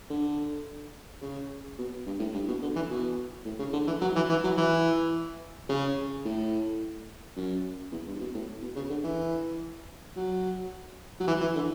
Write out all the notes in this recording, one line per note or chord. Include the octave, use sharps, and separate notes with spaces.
D3
C#3
B2
G2
A2
G2
B2
D3
E3
B2
A2
C#3
D3
E3
F#3
E3
E3
F#3
E3
C#3
A2
F#2
E2
G2
B2
A2
B2
C#3
D3
E3
F#3
F#3
E3
E3
D3